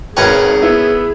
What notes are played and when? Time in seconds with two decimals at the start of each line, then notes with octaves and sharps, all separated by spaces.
0.17 G#1 C#4 G#4 A#4 B4 C#5 G5
0.62 B3 E4